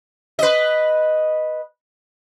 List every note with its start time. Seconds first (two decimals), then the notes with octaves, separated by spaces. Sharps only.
0.39 B4 D#5